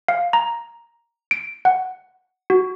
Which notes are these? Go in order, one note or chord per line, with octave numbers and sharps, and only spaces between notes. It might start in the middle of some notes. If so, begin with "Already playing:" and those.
F5
A#5
D7
F#5
F#4